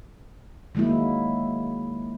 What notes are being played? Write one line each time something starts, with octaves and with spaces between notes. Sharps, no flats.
D#3 F#3 G#3 A#3 E4